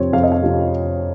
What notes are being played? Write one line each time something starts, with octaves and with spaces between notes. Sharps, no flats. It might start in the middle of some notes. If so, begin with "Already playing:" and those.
Already playing: F2 C3 F3 C4 C#5
F2 F5
D#5
F5
C3 F3 C4